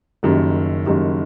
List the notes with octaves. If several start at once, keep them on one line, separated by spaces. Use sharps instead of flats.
F#1 F#2 D#3 G3
F#1 F#2 D#3 G3